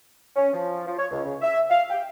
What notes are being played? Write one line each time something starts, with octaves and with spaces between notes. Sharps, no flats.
C#4
F3
F3
C#5
C#2
C#3
E5
F5
G5